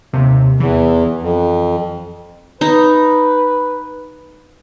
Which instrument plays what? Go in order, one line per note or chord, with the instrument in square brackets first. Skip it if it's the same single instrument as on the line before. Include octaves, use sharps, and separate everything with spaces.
[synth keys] D#2 C3
[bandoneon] E2 [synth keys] E3
[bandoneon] F2
[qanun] D#4 [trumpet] B4